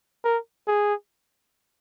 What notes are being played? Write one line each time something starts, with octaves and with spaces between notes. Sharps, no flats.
A#4
G#4